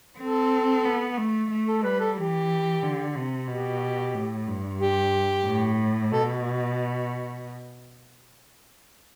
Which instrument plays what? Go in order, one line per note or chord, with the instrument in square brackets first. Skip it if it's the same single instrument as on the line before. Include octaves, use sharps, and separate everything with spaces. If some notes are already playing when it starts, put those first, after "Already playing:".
[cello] C4 [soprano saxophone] A4
[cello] B3
A3
A3
[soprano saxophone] A4
[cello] G3 [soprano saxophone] B4
[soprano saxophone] A4
[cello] E3 [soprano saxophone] G4
[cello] D3
C3
[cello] B2 [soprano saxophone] G4
[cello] A2
G2
[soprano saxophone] G4
[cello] A2
[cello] B2 [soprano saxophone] A4